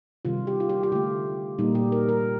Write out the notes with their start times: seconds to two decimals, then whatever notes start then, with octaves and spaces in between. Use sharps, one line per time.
0.25 C3 D#3 G3 F4
0.47 G4
0.60 F4
0.69 G4
0.83 G4
0.92 D3 A3 F4
1.59 A#2 G3 A#3 D#4
1.75 G4
1.92 A#4
2.09 A#4